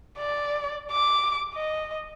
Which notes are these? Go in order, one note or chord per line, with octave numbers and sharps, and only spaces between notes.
D5
D6
D#5